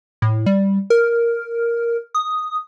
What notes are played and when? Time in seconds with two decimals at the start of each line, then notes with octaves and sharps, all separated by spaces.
0.22 A2
0.46 G3
0.90 A#4
2.15 D#6